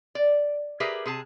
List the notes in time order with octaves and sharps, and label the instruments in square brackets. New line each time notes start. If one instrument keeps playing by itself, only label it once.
[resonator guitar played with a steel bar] D5
G4 G#4 A#4 B4 E5
C3 G#4 A5